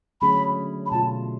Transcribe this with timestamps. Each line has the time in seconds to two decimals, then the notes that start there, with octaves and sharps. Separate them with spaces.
0.21 D3 F#3 A3 C#4 G#4 B5
0.86 B5
0.91 B2 A3 F4 A5